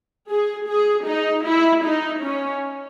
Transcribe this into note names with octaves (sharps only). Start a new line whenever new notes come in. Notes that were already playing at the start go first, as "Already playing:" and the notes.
G#4
G#4
D#4
E4
D#4
C#4